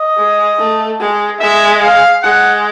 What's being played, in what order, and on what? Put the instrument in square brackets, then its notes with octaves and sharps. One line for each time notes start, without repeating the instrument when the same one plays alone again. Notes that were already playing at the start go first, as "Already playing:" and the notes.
Already playing: [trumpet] D#5
[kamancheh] G#3
A3
G#3
[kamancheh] G#3 [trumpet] E5
[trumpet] F5
[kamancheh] G#3 [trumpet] F#5